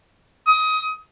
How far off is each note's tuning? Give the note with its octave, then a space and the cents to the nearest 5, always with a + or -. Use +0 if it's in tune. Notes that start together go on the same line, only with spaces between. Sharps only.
D#6 +20